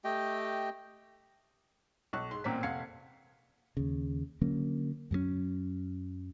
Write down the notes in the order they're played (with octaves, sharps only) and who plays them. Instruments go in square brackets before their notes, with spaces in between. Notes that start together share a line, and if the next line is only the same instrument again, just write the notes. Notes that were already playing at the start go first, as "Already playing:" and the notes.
[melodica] A3 G4 D#5 G5
[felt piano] B1 C#6 F#6
G#2 C6
A1 A#2 A#3 C4 A#5 B6
F1 F5 F#5 G#6 C7 C#7
[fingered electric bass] D#2 C#3
D3 F#3 A#3 C#4
F#2 F#3 G#3 C#4